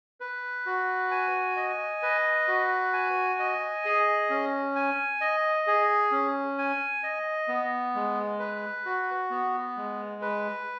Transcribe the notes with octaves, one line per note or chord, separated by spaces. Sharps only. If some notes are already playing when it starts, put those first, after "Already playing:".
B4
F#4
G#5
D#5
B4
F#4
G#5
D#5
G#4
C#4
G#5
D#5
G#4
C#4
G#5
D#5
B3
G#3
B4
F#4
B3
G#3
B4